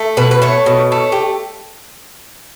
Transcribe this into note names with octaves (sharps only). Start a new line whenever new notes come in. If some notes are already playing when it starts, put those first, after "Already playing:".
Already playing: A3
B2 B4
B4
A3 C#5
B2
A3
G4